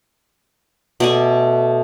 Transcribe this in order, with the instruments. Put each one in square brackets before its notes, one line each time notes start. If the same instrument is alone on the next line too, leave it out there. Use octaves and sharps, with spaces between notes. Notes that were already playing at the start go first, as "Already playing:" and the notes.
[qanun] B2 D5 G#5 [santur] A3